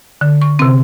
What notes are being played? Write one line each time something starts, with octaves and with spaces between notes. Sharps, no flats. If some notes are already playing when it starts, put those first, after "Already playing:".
D3
C#6
C3 C4